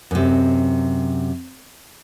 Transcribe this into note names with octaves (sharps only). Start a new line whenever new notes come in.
F#2 C3